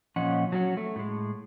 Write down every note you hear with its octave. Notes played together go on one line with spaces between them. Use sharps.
A#2 F3 C#4 D#5 F#5
F#3 C#4 F#4
A3
A2 G#3